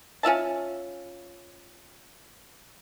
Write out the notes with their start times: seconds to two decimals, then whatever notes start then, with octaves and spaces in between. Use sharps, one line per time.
0.23 C#4 F4 E5 A5